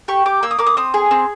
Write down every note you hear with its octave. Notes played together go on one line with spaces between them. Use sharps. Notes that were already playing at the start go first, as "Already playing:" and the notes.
G4 C#6
G4 D6
A#3 E6
D#6
A#3 D6
D#6
C4 D#6
G#4
C4